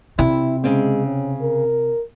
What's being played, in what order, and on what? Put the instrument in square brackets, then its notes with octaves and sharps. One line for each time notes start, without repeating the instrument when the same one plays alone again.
[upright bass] C3 [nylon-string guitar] E4
[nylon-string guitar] C#3 C4 [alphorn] G#3
[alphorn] C#4
A#4